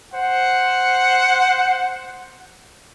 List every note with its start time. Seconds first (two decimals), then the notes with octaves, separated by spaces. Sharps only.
0.15 C5 F#5